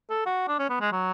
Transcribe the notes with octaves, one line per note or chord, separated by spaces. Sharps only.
A4
F#4
D4
C#4
B3
G#3
F#3